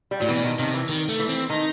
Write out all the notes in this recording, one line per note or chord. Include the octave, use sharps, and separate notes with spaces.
G3
A2 F#3
B2 E3
D#3
C3 D#3
E3
D#3
A3
E3
C4
D#3 D#4